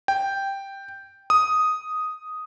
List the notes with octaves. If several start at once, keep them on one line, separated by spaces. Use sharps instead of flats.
G5
D#6